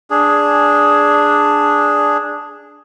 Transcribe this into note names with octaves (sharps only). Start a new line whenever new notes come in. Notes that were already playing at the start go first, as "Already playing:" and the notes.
D4 G#4